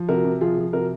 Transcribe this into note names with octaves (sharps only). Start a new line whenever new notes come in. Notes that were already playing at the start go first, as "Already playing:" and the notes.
Already playing: F3
C3 F#4 A#4
C3
F3 F4 G#4
F3
C3 F#4 A#4